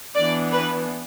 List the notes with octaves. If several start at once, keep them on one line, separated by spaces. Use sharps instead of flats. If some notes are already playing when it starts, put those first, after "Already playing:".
E3 B3 D4 D5
B4